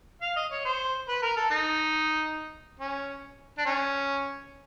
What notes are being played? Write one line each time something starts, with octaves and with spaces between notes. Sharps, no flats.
F5
D#5
C#5
C5
B4
A#4
A4
D#4
C#4
D4
C#4